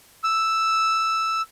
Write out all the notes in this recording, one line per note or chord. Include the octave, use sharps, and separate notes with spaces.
E6